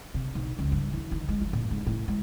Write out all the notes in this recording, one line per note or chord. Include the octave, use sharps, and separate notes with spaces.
C3
B1
C#2
G2
E3
D#3
G#3
F3
A#2
G#2
A2
G#3